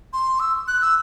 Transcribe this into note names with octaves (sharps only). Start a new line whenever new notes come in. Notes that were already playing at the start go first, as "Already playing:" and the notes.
C6
E6
F#6
E6